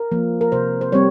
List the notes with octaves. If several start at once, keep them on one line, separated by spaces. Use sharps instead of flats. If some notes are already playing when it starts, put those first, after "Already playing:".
Already playing: A#4
F3 A#3
A#4
C3 C5
C5
G3 C4 C#5